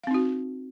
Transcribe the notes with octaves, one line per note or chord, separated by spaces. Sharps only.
C4 D#4 F#4 F5